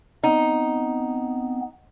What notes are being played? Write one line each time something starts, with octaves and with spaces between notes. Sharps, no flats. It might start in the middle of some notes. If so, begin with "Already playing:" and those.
B3 C4 D#4